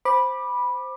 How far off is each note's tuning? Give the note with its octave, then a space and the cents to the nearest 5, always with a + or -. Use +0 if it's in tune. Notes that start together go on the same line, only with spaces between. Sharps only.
C5 +0 B5 -10 D6 +15